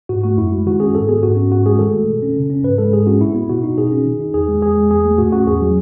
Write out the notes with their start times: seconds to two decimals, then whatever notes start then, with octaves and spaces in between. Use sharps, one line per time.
0.09 G#2 F#4
0.23 A3 F#4
0.38 F#2 E4
0.52 G#3
0.66 D#3 F#4
0.80 C#4 G#4
0.95 G#2 A4
1.08 B3 G#4
1.23 G#2 F#4
1.37 C#4
1.51 G#2 F#4
1.66 G#3 G#4
1.79 D#3 A4
1.93 A3
2.08 B2
2.22 C#4
2.37 C#3
2.50 C#4
2.64 G#2 B4
2.78 G#3 A4
2.92 G#2 G#4
3.07 C#4 F#4
3.21 A2 E4
3.34 B3
3.50 B2 F#4
3.63 D#4
3.78 B2 G#4
3.92 C#4
4.05 D#3
4.20 D#4
4.34 E2 G#4
4.48 G#3
4.62 E2 G#4
4.77 G#3
4.91 E2 G#4
5.05 A3
5.18 A2 F#4
5.32 C#4 F#4
5.47 E2 G#4
5.62 F#3